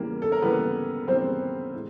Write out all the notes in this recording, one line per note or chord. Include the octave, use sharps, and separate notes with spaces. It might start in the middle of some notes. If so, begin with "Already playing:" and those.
Already playing: E2 C#3 E3 G3 A#3
A4
A#4
E2 C#3 E3 G3 A#3 B3 B4
E2 C#3 E3 G3 A#3 C4 C5
A2 E3 G#3